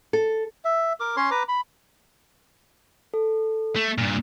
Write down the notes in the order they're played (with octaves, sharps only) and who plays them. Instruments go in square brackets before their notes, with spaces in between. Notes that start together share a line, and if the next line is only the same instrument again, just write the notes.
[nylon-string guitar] A4
[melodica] E5
A#4 D6
C#4 C#5 C6
B4 A#5 D6
B5
[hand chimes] A4
[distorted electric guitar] A3
G2 A#2